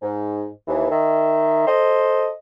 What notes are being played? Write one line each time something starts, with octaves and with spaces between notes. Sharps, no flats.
G#2
D#2 E3
D#3 E5
A4 C5 D#5